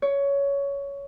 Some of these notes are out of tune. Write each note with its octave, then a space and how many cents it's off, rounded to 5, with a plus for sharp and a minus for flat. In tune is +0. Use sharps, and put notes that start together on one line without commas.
C#5 +15